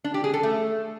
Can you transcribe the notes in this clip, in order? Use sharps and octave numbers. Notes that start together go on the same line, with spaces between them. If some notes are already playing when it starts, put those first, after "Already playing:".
D4
G4
G#4
A4
A3